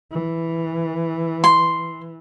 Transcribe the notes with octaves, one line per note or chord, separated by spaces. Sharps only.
E3
C6